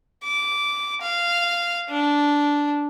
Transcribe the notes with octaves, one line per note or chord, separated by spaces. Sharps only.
D6
F5
D4